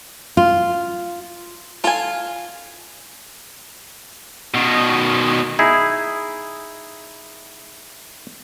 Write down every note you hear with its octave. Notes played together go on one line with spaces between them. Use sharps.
F4
F4 A4 G#5
B2 D#3
D#4 E4 G#4